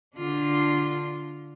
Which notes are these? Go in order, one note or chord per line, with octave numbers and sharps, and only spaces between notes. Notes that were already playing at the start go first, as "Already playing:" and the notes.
D3 D4 F4